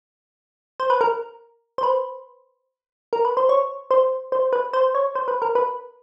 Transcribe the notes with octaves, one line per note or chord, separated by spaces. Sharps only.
C5
B4
A#4
C5
B4
A#4
B4
C5
C#5
C5
C5
B4
C5
C#5
C5
B4
A#4
B4